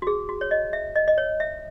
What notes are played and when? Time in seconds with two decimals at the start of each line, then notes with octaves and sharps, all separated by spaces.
0.02 F#4
0.07 G#4
0.29 F#4
0.41 C#5
0.51 D#5
0.73 E5
0.95 D#5
1.08 D#5
1.18 C#5
1.40 E5